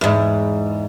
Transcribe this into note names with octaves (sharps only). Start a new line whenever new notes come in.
E2 G#2